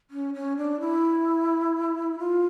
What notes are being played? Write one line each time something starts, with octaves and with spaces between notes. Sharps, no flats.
C#4
C#4
D4
E4
F4